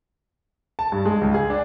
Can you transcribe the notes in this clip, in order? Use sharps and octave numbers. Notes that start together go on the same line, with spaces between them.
A5
G2
G#3
C#2
G#4
D4